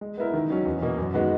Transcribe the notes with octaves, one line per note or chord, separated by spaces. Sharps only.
G#3
B3 E4 A#4
D#3
F#3 C#4
E2
B2 A#3
F#2
D#3 G#3 B3 F#4